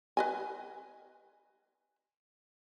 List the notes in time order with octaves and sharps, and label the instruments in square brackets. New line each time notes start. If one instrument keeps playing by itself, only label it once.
[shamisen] B4 D#5 G#5